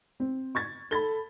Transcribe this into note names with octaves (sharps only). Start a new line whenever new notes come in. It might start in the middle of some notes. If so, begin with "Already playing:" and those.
C4
C#6 G#6 A6
A4 B5 A6 G7